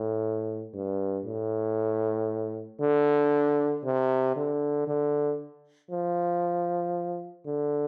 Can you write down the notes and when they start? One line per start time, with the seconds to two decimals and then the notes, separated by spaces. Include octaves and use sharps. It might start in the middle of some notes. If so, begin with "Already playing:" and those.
Already playing: A2
0.74 G2
1.25 A2
2.81 D3
3.84 C3
4.36 D3
4.87 D3
5.91 F3
7.46 D3